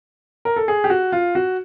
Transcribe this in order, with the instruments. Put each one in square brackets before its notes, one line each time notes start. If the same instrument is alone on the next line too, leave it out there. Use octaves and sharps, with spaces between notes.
[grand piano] A#4
A4
G#4
G4
F#4
F4
F#4